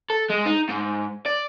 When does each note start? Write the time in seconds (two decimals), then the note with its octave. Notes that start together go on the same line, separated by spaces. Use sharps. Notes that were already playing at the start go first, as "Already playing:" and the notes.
0.10 A4
0.30 G#3
0.45 D#4
0.69 G#2
1.26 D5